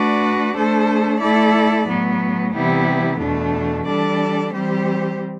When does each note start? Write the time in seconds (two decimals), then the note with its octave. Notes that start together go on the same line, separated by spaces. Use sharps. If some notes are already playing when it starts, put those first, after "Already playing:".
Already playing: A3 D4 F#4 B4 D5
0.53 A3 D4 A4 C5
1.19 A3 E4 A4 D5
1.85 A2 F#3 B3
2.52 C3 E3 G3 B3 E4
3.18 E2 B2 A3 D4
3.85 E3 G3 D4 A4 D5
4.51 E3 G3 C4 G4 C5